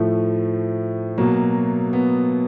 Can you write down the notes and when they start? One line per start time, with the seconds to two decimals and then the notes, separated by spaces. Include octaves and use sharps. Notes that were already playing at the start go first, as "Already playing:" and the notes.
Already playing: A2 F3 A3
1.18 B2 F#3 A#3
1.93 B3